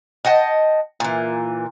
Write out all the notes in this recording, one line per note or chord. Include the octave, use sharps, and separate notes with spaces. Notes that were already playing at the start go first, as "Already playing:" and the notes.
D#5 F#5 G5 A5
A#2 E3